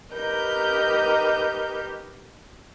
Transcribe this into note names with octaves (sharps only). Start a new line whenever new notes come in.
D#4 G4 A#4 B4 G6